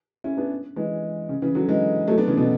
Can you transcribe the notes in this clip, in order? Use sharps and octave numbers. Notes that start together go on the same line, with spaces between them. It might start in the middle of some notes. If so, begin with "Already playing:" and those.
C#4 E4
B3 D4
E3 G#3
C#3
C#3 E3
D3 F#3
E3 G#3
F#3 A3
B3 D4
C#3 E3
B2 D3